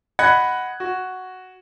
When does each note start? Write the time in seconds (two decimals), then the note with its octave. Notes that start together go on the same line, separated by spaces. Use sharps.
0.19 D#5 F#5 B5 F#6 G#6 C#7
0.80 F#4